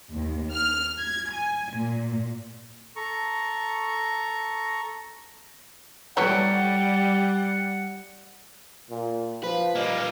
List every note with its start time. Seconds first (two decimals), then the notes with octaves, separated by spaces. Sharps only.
0.12 D#2
0.51 F6
1.01 G#6
1.31 G#5
1.75 A#2
2.96 A4 A#5 C#6
6.17 E3 F#3 G3 A3 F#5
8.90 A#2
9.44 F3 B4 F5
9.75 A#2 G3 A#3 D#5